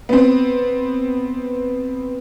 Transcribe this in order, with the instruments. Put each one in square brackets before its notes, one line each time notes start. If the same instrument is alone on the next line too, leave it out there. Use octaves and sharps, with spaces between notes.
[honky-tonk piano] B3 C4